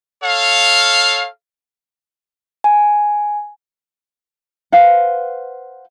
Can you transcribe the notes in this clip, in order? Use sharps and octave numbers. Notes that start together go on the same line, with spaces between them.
A4 C#5 F5
G#5
B4 C5 F5 F#5